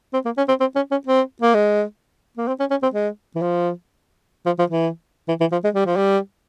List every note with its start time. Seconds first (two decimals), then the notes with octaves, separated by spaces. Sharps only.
0.14 C4
0.25 A#3
0.37 C#4
0.48 C4
0.60 C4
0.76 C#4
0.91 C#4
1.07 C4
1.42 A#3
1.54 G#3
2.37 A#3
2.48 C4
2.60 C#4
2.71 C#4
2.83 C4
2.94 G#3
3.36 E3
3.42 F3
4.46 F3
4.59 F3
4.70 E3
5.28 E3
5.40 E3
5.52 F3
5.64 G#3
5.75 G3
5.86 F3
5.97 G3